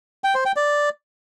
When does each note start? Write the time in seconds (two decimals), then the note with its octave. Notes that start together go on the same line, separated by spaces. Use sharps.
0.24 G5
0.35 C5
0.45 G5
0.56 D5